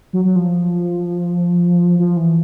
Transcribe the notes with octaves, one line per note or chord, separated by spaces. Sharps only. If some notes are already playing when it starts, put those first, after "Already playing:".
F#3
F#3
F3
F3
E3